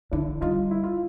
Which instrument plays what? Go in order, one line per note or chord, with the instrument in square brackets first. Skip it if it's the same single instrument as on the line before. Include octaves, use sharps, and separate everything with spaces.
[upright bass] D3 [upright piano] D4 E4
[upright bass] G3 [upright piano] D#4 F4
[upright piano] E4
F4